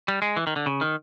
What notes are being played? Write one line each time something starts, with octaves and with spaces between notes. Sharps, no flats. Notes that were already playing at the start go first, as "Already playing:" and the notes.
G3
G#3
E3
D#3
D3
C#3
D#3